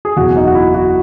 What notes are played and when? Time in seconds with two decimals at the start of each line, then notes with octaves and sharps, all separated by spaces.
0.05 G#4
0.16 F#1 E2 B2 F#4
0.36 D#4
0.47 F#4
0.55 E4
0.74 F#4